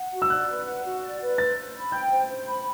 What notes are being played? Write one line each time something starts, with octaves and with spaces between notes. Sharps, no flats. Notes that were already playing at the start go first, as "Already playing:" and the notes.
Already playing: F#5
F#4
E6
D5 F#6
B4
F#5
F#4
D5
B4
C5 A6
C5
B5
G5 G6
C5
C5
B5